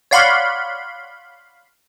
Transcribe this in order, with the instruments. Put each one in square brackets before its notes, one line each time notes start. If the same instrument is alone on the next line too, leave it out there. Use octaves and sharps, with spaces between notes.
[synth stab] C#5 D5 F5 F#5 B5 C6